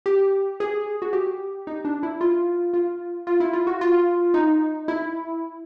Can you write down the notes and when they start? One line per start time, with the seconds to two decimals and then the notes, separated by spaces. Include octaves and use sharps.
0.06 G4
0.60 G#4
1.02 F#4
1.13 G4
1.67 D#4
1.85 D4
2.03 E4
2.21 F4
2.74 F4
3.27 F4
3.40 E4
3.53 F4
3.67 F#4
3.81 F4
4.34 D#4
4.88 E4